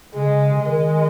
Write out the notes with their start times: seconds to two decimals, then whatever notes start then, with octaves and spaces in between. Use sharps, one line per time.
0.14 C#3 G#3
0.66 D#3 G#3